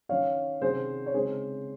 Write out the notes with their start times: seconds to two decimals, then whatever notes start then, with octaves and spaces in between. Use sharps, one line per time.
0.09 D#3 F#3 C#4 C#5 F5
0.62 C3 D#3 F#3 C#4 G#4 C5
1.06 C#5
1.14 C#3 G#3 C4 D#4 G#4 C5